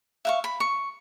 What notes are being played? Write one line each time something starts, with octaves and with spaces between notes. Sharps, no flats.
E5 F5 C#6
B5
C#6